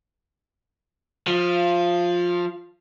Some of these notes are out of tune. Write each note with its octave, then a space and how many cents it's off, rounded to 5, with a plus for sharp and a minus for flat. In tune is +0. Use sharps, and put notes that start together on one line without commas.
F3 +15 F5 -20